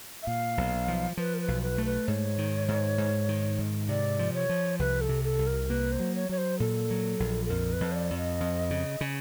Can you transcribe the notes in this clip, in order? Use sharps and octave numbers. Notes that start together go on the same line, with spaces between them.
E5
A#2 F5
B1
F3
F3 B4
A#4
B4
B1
B4
A3
B4
G#2 C#5
D#3
G#2
G#2
D#3
G#2
C3 D5
F3
C#5
F3
C2 B4
A4
C3
A4
C2
A#4
A#3 B4
C5
F#3
C#5
F#3 C#5
C5
A#2 A4
F#3
A#1
A4
F2 A#4
B4
F2
C#5
D5
F2
D#5
F2
C#3
C#3